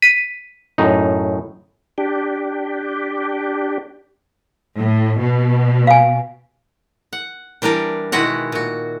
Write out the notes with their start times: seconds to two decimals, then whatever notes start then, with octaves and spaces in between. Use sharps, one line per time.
0.02 B6 D#7
0.78 F#2 A2 D#4
1.98 D4 G4
4.77 A2
5.20 B2
5.87 F5 G#5
7.13 F#5
7.62 E3 G3 D4 A#4 D5
8.12 B2 D#3 G#3 E4 F#4 F#5
8.52 A#2 F#4